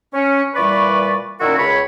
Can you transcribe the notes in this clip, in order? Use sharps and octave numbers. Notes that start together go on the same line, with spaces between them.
C#4
A#2 E3 G3 B4 D5 C#6
A#2 D#3 C#4 E4 F#4 A#4
C#2 C#5 B5